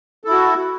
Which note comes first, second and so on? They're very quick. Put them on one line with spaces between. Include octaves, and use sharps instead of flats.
A4 E4 F#4